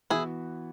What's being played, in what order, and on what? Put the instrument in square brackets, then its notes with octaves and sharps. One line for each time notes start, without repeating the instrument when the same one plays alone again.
[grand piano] E3 B3 F#4 [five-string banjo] E4 G#4